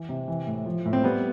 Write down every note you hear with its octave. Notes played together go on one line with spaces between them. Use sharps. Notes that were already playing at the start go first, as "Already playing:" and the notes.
Already playing: E3
C3
E3
A2
F3
A2
C4
G3 B3